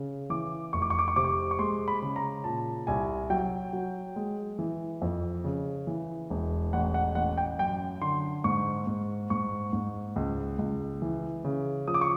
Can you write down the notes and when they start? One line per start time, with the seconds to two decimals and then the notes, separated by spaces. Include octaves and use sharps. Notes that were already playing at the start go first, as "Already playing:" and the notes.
Already playing: C#3
0.30 E3 D6
0.73 F1 C#6
0.82 D6
0.90 C#6
0.99 D6
1.08 C#6
1.16 C3 D6
1.24 C#6
1.51 C#6
1.59 G#3 C6
1.88 B5
2.02 C#3
2.16 A#5
2.44 A#2 A5
2.87 C2 G#5
3.30 F#3 G5
3.73 F#3
4.16 G#3
4.59 E3
5.02 F2
5.44 C#3
5.87 E3
6.30 E1
6.73 A1 F#5
6.94 F#5
7.15 A1 F#5
7.38 G5
7.59 F#2 G5
8.01 D3 C6
8.44 G#2 C#6
8.87 G#2
9.30 G#2 C#6
9.73 G#2
10.16 C#2
10.59 C#2
11.02 E3
11.44 C#3
11.88 F3 D#6
11.94 D6
12.01 C#6